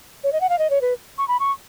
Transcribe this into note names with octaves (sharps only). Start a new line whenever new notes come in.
C#5
D#5
F#5
F5
D#5
C#5
B4
C#6
B5
C#6